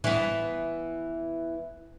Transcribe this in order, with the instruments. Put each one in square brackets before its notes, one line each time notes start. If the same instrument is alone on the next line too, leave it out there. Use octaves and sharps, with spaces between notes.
[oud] E3 B3